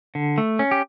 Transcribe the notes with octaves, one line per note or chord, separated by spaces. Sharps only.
D3
A3
C#4
G4